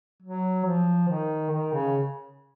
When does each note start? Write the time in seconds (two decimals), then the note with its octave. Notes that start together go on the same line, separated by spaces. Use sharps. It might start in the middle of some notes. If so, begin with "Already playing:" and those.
0.22 F#3
0.65 F3
1.08 D#3
1.50 D#3
1.73 C#3